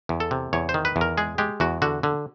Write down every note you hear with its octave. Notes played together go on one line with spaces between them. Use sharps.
E2
A4
C3
E2 C#5
C5
D#3
B4
E2
A#4
G#3 G#4
G#3 G4
E2 F#4
D3 F#4
D3